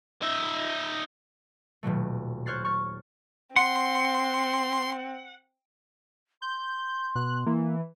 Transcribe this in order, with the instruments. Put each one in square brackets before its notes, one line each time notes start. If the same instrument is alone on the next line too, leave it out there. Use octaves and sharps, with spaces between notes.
[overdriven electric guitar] D#4 E5
[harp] D#1 B2 F#3 A3
C5 C#5 F6 F#6 A6 C7
C#6 F6 A6
[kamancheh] C4 [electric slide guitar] F#5 [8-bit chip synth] C6
[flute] C6 [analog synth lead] G6
[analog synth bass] B2 [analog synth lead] F#6
[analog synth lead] E3 [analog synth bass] A#3